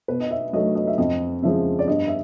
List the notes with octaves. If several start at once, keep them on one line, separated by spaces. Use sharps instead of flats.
B2 B4
D#5
E5
F#3 A3 D#5
D#5
E5
F2 D#5
C#3 F3 G#3 E5
D5
G2 D#5
E5